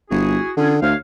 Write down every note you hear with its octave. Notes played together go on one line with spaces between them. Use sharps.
G1 E4 F#4 G#4
D3 C#4 F4 G#4
D2 C5 C#5 F5